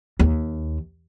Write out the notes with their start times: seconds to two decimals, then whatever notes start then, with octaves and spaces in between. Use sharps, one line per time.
0.19 D#2